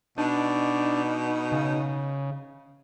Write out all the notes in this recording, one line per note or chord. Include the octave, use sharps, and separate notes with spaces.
B2 D4 D#4
C#3